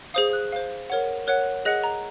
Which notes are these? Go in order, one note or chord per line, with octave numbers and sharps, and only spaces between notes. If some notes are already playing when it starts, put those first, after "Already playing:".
G#4 C5 F5 D#6
F#6
C5 F5
A#4 C#5 F#5
A#4 C#5 F#5 F#6
G#4 D#5 F#5 F#6
A#5